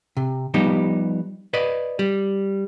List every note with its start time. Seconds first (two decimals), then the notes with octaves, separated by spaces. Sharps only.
0.17 C3
0.54 F3 G3 B3 D#4 G4
1.53 B4 D5 D#5
1.99 G3